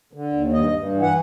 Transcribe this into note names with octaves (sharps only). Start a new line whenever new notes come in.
D3
D#2
G2 D#5
G2
E3
F#5